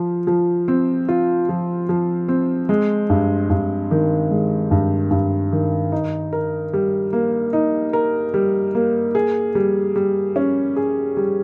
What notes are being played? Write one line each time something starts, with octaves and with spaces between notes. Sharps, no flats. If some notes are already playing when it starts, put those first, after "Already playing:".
Already playing: F3 F4
F3
C4
F4
F3
F3
C4
G#3
G2
G2
D#3
G#3
G2
G2
D#3
D#4
A#4
G3
A#3
D#4
A#4
G3
A#3
G#4
G3
G3
C#4
G#4
G3